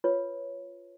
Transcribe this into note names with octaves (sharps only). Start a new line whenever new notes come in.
F4 B4 C#5